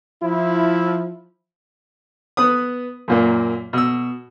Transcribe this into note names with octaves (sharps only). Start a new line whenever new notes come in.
F3 E4
B3 B4 D#6
F#2 A#2 A#3
B2 E6